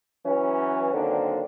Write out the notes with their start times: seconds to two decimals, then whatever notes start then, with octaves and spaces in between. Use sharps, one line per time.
0.25 E3 F#3 C#4
0.93 D3 D#3 F#3 A#3 C4 D4